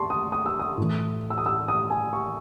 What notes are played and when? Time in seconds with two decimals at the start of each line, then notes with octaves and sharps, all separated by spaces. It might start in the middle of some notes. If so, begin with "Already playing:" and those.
Already playing: A5 C6 C#6
0.10 D#6
0.32 D#6
0.46 E6
0.59 D#6
0.78 A2 E3
1.30 E6
1.38 D#6
1.46 E6
1.68 D#6
1.90 G#5
2.13 C#6